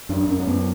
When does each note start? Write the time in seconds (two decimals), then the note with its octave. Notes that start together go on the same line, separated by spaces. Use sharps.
0.09 F#2 D4
0.28 F#2 C#4
0.40 C#4
0.47 F#2 B3